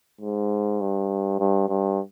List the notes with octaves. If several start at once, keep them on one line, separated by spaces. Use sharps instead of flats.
G#2
G2
G2
G2